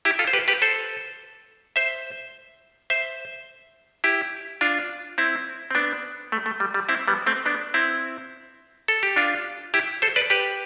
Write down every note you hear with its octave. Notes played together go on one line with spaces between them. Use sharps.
E4 G4
F4 A4
C5
G4 B4
G4 B4
A4 C5
C5 E5
C5 E5
E4 G4
D4 F4
C4 E4
C4
B3 D4
A3
A3
G3
G3
C4 E4
G3 B3
A3 C4
B3 D4
C4 E4
A4
G4
D4 F4
E4 G4
A4 C5
B4 D5
G4 B4